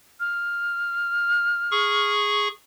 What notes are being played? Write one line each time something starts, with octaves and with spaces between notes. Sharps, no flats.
F6
G#4 C#6